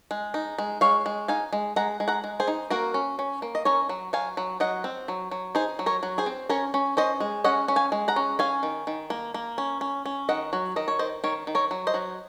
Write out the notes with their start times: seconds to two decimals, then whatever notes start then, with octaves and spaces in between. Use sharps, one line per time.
0.11 G#3
0.34 D#4
0.58 G#3
0.81 G#3 C#5 F5
1.06 G#3
1.28 D#4 F5 G#5
1.53 G#3
1.76 G#3 F#5 A#5
2.00 G#3
2.08 F#5 A#5
2.24 G#3
2.40 G#4 C5
2.48 D#4
2.70 A#3 F#4 A#4
2.94 C#4
3.19 C#4
3.42 A#3
3.55 D#5
3.65 C#4 A#4 C#5
3.89 F#3
4.13 F#3 F5 G#5
4.37 F#3
4.60 F#3 D#5 F#5
4.84 C4
5.08 F#3
5.31 F#3
5.55 D#4 G#4 C5
5.79 F#3
5.86 A#4 C#5
6.03 F#3
6.18 G#4 C5
6.26 C4
6.49 C#4 A#4 C#5
6.74 C#4
6.97 C#4 C5 D#5
7.20 G#3
7.44 C#4 D#5 F#5
7.68 C#4
7.76 F5 G#5
7.92 G#3
8.08 F#5 A#5
8.16 C#4
8.39 C#4 F5 G#5
8.63 D#3
8.87 D#3
9.10 A#3
9.34 A#3
9.58 C#4
9.81 C#4
10.06 C#4
10.29 D#3 D#5 F#5
10.53 F#3
10.76 D#3 D#5
10.88 C#5
10.99 D#3 C5 D#5
11.24 D#3 A#4 C#5
11.47 D#3
11.55 A#4 C#5
11.71 F#3
11.87 C5 D#5
11.94 F#3